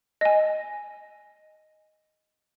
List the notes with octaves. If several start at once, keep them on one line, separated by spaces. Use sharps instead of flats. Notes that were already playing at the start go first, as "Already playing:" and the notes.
D#5 G#5